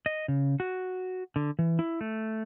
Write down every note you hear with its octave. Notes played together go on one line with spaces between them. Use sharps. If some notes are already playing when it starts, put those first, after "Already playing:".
D#5
C#3
F#4
D3
E3
E4
A3